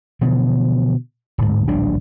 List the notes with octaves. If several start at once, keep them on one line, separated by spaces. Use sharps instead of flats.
B2 D3 E3 F3
D1 G#2
D1 A#1 G3 D4